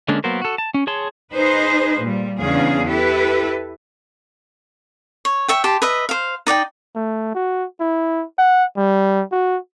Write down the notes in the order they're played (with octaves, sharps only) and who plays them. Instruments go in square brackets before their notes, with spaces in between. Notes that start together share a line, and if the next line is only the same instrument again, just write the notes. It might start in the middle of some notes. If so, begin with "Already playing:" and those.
[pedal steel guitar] D3 G#3 A#3 C#4 D4
F#3 A#3 B3 A#4 C5
F#4 A4
A5
C#4
G#4 C#5 A5 C6
[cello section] D#4 G#4 B4 C5
A#2 G3
E2 C#3 D4 G#4 F5
E4 G4 A4 B4
[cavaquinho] C#5
C#5 E5 G5
G4 A5 C6
B4 D#5 E5
C5 F5
D#4 D5 F#5 G5
[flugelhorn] A3
F#4
E4
F#5
G3
F#4